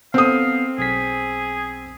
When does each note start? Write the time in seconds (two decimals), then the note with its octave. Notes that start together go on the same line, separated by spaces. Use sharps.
0.14 B3 C4 A4 F5 D#6
0.78 B1 G#4 B6